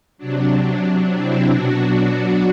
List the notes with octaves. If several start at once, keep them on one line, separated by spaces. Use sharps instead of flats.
C3 F#3 D4
C4 E4
B2 F#3 D4 F#4